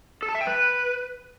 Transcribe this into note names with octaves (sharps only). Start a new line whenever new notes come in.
A4
A5
E5
G5
B4